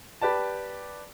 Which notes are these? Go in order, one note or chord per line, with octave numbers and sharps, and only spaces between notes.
G4 B4 D5 A5